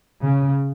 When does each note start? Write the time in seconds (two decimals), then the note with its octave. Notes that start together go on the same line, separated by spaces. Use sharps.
0.25 C#3